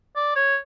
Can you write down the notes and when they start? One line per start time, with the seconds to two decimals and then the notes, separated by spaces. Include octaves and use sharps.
0.16 D5
0.36 C#5